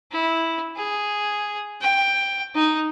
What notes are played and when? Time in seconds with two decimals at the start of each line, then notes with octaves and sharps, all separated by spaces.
0.12 E4
0.77 G#4
1.82 G5
2.55 D#4